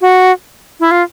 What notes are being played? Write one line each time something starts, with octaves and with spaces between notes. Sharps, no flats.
F#4
E4
F4